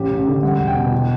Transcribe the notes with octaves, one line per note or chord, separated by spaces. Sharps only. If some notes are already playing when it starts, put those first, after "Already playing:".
Already playing: A1 G4
A1
D3
G3 F#5
E1
G5
B2
E3